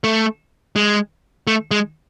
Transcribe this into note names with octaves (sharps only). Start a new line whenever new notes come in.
A3
G#3
A3
G#3